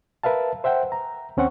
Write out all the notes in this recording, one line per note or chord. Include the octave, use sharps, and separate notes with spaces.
A#4 B4 E5 F5 A5
C5 E5 F#5 G5
A#5
D#2 C4 C#4 F#5 C#6